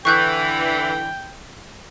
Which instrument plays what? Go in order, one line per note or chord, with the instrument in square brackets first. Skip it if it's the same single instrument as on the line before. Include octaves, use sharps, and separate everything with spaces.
[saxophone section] D3 E3 [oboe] G5 [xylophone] C#6 F#6 G6